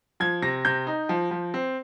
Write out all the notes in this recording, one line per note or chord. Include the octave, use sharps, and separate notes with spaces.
F3 G#6
C3 A#6
C3 G6
D#4
F3
F3
C4